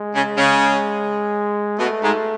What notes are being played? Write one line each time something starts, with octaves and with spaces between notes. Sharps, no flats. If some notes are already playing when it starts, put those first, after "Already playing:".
Already playing: G#3
C#3
C#3
B2 A3
G#2